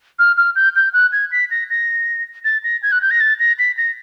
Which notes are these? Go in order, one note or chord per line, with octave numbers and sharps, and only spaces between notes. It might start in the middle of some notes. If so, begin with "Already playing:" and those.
F6
F6
G6
G6
F#6
G#6
B6
A#6
A#6
A6
A#6
G#6
F#6
G6
A#6
A6
A#6
B6
A#6